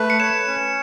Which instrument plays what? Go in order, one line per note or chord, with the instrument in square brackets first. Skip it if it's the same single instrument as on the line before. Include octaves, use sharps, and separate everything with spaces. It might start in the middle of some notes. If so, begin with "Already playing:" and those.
Already playing: [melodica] A3 B4
[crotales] C#7
[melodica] C#5 [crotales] E7
[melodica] C#4